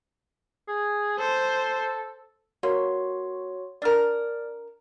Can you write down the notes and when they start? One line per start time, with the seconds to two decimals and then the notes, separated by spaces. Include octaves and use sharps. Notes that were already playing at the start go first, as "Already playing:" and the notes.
0.68 G#4
1.19 A4 C5
2.63 A#3 F#4 C#5 C6
3.82 D4 A#4 D5 F6